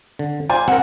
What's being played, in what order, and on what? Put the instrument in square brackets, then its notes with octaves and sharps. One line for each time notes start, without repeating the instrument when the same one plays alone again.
[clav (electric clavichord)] D3
[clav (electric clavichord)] F4 C5 D5 [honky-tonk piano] G#5
[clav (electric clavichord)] C4 A#4 [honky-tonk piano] F#5